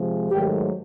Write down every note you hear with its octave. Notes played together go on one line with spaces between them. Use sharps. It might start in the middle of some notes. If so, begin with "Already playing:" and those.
Already playing: C3 F3 G#3
G#2 D#3 F#3 A3 G4